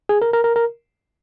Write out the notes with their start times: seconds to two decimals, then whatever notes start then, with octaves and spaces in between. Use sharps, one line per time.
0.09 G#4
0.22 A#4
0.33 A#4
0.44 A#4
0.56 A#4